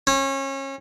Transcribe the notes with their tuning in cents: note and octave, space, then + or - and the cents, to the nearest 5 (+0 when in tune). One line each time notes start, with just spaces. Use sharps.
C#4 -30